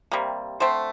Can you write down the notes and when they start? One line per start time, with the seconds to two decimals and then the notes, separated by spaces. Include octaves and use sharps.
0.12 C3 G3 A#3
0.60 D3 A3 C4 C5